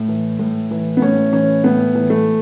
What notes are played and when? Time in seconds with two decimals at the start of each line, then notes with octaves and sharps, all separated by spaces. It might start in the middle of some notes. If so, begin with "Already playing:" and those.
Already playing: A2
0.08 E3
0.39 A2
0.71 E3
0.97 B3
1.02 A2 C#4
1.32 E3 C#4
1.64 A2 B3
1.95 E3
2.10 A3